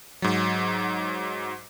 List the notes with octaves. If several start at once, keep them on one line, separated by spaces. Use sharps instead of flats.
G#2 F#3